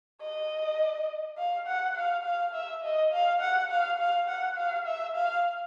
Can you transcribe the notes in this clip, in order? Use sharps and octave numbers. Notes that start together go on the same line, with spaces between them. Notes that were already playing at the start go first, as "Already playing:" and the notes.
D#5
F5
F#5
F5
F5
E5
D#5
F5
F#5
F5
F5
F#5
F5
E5
F5